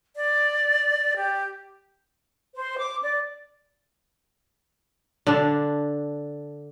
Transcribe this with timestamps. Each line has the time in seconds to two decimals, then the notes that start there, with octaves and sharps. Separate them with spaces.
0.16 D5
1.17 G4
2.55 C5
2.79 D6
3.03 D5
5.27 D3 D4